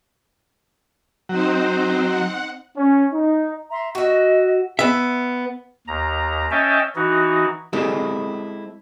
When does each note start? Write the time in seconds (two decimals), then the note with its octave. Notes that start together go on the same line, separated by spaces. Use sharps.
1.29 F#3 C4 D#4 C5
2.05 F#5
2.76 C#4
3.13 D#4
3.71 E5 A#5 C6
3.95 F#4 D#5 E5
4.79 B3 E5
5.87 D#2 A#5
6.51 C#4 D#5 E5 G5 A5
6.96 E3 D#4 F#4
7.73 G#3 C4 E4 G4 A4